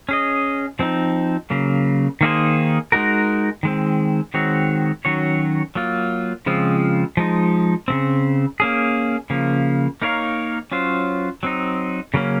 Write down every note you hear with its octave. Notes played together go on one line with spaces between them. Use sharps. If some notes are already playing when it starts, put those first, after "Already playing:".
C#4 G#4 D#5
F3 C4 D#4
C#3 F#3 A#3
D#3 A#3 D#4 G#4 C5
G#3 D#4 F#4 A#4
D#3 G#3 C4
D#3 G#3 C4 F#4 C#5
D#3 F#3 C#4 F#4 C#5
F#3 A#3 F4
C#3 F3 G#3 C4 F4
F3 G#3 D#4
C#3 F3 C4
A#3 C#4 G#4
C#3 F3 A#3
A#3 D#4 A#4 C#5 F5
F#3 C#4 F4 C5
F#3 C4 D#4
C#3 F#3 A#3 C#4